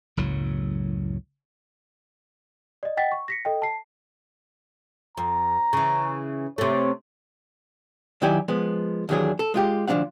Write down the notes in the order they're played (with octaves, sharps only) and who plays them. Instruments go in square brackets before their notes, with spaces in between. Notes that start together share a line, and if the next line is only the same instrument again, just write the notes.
[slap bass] F#1 C#2 A2 F#3
[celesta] D5 D#5
D#5 F#5 G5 A6 B6
C#6
A#6 B6 C#7
A4 D#5 G5
A5 C7
[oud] F2 [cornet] A#5
[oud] C#3 E3
[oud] C3 A3 [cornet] C#5
[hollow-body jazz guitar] D#3 F#3 E4 G4 D5 G#5
F3 G#3 B3
D#2 D#3 E3 F#3 D4 G#4
A4
G#3 F4 G4
D2 F3 C4 D4 F5 F#5